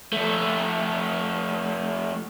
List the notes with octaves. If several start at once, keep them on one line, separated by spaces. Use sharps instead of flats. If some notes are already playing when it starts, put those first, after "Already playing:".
F3 A3